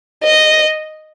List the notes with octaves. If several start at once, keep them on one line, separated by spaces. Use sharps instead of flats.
D#5